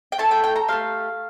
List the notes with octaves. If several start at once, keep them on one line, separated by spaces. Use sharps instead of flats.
G5
A3 E4 A4 A5
G5
G5
A#5
A3 C4 G4 F5